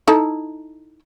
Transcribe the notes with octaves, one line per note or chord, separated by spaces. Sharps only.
D#4 E4 A4